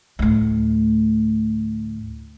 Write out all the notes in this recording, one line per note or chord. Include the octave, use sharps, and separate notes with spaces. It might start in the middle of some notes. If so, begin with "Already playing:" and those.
D2 A2